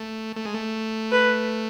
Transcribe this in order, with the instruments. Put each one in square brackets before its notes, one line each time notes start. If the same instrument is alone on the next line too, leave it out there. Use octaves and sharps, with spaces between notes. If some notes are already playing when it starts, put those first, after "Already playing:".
Already playing: [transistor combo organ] A3
A3
G#3
A3
[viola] B4